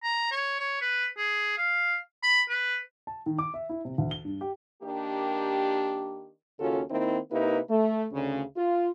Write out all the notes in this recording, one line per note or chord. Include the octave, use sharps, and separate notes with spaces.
A#5
C#5
C#5
B4
G#4
F5
B5
B4
A5
D#3
D6
E5
E4
C3
D2
G7
G2
G4
D#3 A#3 D4 G4
D#2 C#3 C#4 F4 F#4 A4
D#3 A#3 C4 D#4 E4
C3 A#3 D#4 E4 G4 B4
A3
D2 C#3
F4